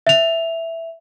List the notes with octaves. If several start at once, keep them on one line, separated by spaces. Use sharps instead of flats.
E5 F7